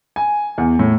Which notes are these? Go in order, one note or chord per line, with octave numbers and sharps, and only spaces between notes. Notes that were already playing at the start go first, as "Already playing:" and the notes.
G#5
E2
A2